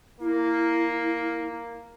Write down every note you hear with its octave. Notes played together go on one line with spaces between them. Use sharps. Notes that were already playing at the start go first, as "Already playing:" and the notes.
A#3 E4